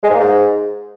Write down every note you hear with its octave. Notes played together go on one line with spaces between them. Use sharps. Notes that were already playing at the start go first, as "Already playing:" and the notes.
G#3
G#2
A#3
G#2